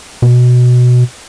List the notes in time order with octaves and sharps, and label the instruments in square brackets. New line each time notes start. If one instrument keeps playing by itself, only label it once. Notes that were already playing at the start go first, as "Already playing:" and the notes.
[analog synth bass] B2